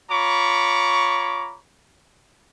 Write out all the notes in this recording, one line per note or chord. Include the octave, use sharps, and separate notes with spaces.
F4 C#5 A#5 B5 C#6 D6